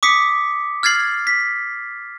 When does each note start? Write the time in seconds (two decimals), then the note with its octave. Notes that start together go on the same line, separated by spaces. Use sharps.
0.03 D6 D#6 B6 C#7
0.83 F6 G#6 A6 C7 F#7
1.27 B6